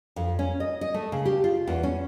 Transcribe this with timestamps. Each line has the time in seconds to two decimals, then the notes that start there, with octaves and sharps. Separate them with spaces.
0.16 F2
0.39 C#4
0.60 D#5
0.81 D#5
0.94 A3
1.12 C#3
1.25 G4
1.44 F4
1.67 E2
1.83 C#4